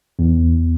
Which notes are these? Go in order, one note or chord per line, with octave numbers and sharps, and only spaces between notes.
E2